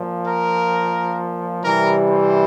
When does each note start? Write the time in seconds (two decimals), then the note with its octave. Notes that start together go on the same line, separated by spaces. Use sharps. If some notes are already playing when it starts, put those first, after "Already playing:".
Already playing: A#2 F3
0.26 A#4
1.63 C3 E3 G3 A#4
2.09 C5